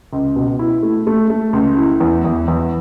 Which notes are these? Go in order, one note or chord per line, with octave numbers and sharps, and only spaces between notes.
C#2
B2
E4
A3
A3
A3
C#2
E4
E2
E2
E2